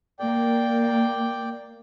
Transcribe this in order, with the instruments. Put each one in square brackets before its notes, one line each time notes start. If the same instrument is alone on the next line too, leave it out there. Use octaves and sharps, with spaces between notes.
[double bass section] A#3 [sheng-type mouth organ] D5 G5